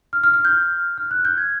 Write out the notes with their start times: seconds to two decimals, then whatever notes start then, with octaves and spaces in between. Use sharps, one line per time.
0.13 F6
0.24 F6
0.34 F6
0.45 G6
0.98 F6
1.11 F#6
1.25 G6
1.38 G#6